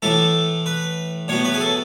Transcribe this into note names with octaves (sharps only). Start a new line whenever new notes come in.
A2 E3 A3 A4
B4
A2 F#3 B3 C#5
B4
G#4
A4